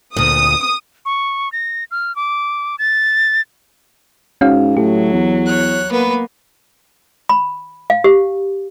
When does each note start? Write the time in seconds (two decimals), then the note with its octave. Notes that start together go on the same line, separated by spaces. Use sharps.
0.17 D2 A#2 D#6
1.05 C#6
1.52 A#6
1.91 F6
2.16 D6
2.79 A6
4.41 G#2 C#4 F#4 F5
4.77 A2 F#3 G4
5.13 E2
5.47 C#5 F#6
5.91 A#3 B3 B4
7.29 B5
7.90 F5
8.04 G4